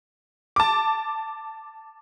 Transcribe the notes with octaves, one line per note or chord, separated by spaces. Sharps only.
A5 D6